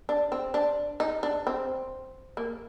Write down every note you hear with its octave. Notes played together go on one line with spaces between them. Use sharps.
D4
C4
D4
D#4
D4
C4
A#3